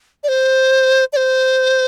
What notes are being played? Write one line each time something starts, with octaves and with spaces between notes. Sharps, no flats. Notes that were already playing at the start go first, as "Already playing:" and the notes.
D5
C5
D5
C5